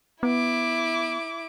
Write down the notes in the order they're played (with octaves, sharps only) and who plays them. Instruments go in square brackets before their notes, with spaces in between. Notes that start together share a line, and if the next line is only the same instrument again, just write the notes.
[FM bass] B3 [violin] E4 D6